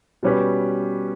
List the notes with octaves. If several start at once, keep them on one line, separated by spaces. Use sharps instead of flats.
B2 G3 C#4 G4 B4